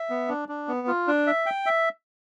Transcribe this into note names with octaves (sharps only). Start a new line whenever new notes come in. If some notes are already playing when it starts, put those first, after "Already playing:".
Already playing: E5
B3
D4
D4
B3
F4
D4
E5
G5
E5